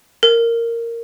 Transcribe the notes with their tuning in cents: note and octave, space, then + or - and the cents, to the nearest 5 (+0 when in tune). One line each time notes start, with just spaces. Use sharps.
A#4 -10